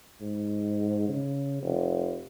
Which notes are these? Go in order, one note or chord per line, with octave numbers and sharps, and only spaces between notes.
G#2
C#3
F1